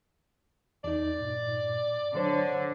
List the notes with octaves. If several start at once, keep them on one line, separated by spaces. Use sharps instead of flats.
E2 D#4 D5
G2 A#2
D3 F#3 C5 C#5